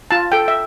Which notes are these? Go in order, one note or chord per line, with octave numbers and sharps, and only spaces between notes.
F4 A5
A4 G5
E5